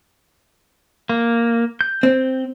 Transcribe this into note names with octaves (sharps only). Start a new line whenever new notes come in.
A#3
G6
C4